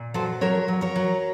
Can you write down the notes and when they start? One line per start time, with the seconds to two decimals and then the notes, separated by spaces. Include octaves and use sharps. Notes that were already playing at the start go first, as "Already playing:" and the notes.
Already playing: A#2
0.14 F#3 A4 C5
0.41 F#3 A#4 C#5
0.68 F#3
0.81 A#4 C#5
0.96 F#3